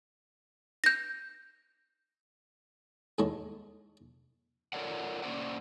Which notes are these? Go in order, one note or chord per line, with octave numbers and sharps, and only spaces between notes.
G6 A#6
D#2 G#2 D#3 G#3 A4 C#5
F4 A4 A#4 C#5 D5 F#5
A#3 C#4 F4 C5 D5 F#5